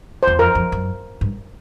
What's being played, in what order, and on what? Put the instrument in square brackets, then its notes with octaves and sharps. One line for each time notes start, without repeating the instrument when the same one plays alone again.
[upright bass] E2 [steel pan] C5
[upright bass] F2 [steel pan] A#4
[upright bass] F2
F#2
G2